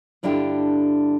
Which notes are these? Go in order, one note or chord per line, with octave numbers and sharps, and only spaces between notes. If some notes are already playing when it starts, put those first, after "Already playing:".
G2 D3 D4 E4 F4 G4